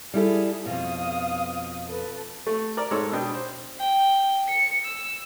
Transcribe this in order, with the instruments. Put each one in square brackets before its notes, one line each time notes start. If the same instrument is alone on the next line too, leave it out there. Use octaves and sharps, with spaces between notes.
[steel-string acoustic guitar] G3 E4 A4 [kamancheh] G#4
[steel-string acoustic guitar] F2 B2 [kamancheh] F5 D#6
[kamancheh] A4 B4
[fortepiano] A3
A#4 D5
G#2 G#3 A4 C#5 C6 E6
B2 D4 D#5 G5
C5
[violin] G5
C#7
E6